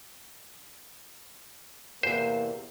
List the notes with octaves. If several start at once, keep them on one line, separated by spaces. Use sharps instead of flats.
E2 C3 A#3 C5